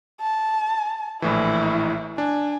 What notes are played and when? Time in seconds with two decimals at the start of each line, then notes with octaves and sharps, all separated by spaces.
0.21 A5
1.22 A#1 A2 E3 E4
2.18 D4 G#5